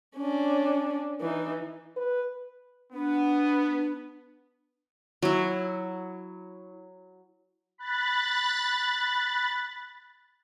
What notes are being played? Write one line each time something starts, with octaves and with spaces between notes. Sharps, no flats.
C#4 D4
E3 D#4
B4
B3 D4
F#3 E4
B5 F#6 A6